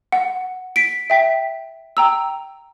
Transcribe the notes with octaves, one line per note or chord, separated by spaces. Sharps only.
F#5
B6 D7
E5 G5 B6
G5 A#5 E6